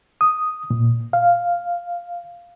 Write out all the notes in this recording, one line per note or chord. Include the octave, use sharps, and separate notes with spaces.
D#6
A#2
F5